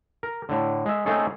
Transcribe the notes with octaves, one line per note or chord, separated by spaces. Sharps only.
A#4
A2 D3
G#3 E5
A3 C4 C#4 D#4 G#4 A4